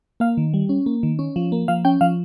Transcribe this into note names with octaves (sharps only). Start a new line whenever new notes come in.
A#3 F5
D#3
G3
C#4
A#3
D#3
C#4
F3
A#3
F3 F5
C#4 G5
F3 F5